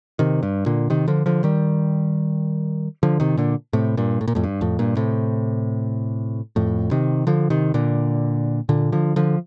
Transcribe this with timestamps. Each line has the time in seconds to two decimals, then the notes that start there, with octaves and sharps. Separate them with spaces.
0.19 C3 D#3
0.43 G2
0.66 A#2 D3
0.90 C3 D#3
1.08 D3 F3
1.26 D3 F3
1.44 D#3 G3
3.03 D3 F3
3.20 C3 D#3
3.37 A#2 D3
3.73 A2 C3
3.97 G2 A#2
4.21 A2
4.28 A#2
4.35 F2 A2
4.44 G2
4.61 F2 A2
4.79 G2 A#2
4.97 A2 C3
6.56 F2 A2
6.91 C3 D#3
7.27 D3 F3
7.50 C3 D#3
7.74 A#2 D3
8.69 A#2 D3
8.92 D3 F3
9.16 D3 F3